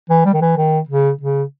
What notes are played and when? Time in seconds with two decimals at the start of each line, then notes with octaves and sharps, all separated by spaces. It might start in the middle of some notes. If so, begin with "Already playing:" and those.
0.10 E3
0.25 G3
0.33 D#3
0.42 E3
0.57 D#3
0.89 C#3
1.21 C#3